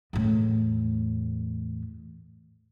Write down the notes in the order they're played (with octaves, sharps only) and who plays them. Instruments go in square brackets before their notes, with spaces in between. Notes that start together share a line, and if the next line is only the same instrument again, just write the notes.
[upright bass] E2 A2